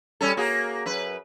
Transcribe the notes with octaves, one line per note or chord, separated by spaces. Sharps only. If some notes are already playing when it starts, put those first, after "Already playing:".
G3 C#4 A4
A#3 F#4 G#4
F#2 B4